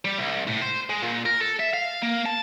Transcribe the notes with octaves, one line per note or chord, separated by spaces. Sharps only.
G3
C2
A2
C5
G#3
A#2
A#4
A4
E5
F5
A#3
A5